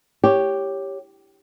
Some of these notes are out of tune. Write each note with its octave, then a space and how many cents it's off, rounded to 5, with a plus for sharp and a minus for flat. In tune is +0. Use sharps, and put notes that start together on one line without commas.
G4 +0 C#5 +0